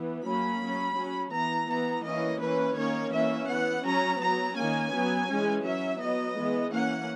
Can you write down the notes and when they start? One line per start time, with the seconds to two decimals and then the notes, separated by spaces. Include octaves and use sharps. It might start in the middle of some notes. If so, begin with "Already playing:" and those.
Already playing: E3 B3
0.25 F#3 A#3 C#4 B5
0.62 F#3 C#4
0.98 F#3 C#4
1.33 E3 B3 A#5
1.69 E3 B3 A#5
2.05 E3 A#3 C#4 D#5
2.41 E3 A#3 C#4 B4
2.77 D#3 A#3 C#4 C#5
3.13 E3 A#3 C#4 E5
3.49 E3 B3 F#5
3.85 F#3 C#4 A#5
4.21 F#3 B3 A#5
4.57 D#3 A#3 C#4 G#5
4.93 F#3 B3
5.29 E3 G#3 C#4
5.64 F#3 C#4 E5
6.01 F#3 B3 D#5
6.37 E3 G#3 B3
6.72 E3 A#3 C#4 F#5